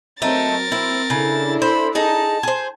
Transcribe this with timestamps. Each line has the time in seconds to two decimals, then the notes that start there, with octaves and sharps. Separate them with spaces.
0.22 F#3 A3 C4 D#4 A#4 A6
0.72 C4 E4
1.10 C#3 D4 E4 A4
1.62 C5 B5
1.95 D#4 G#4 A5
2.43 G#4 C5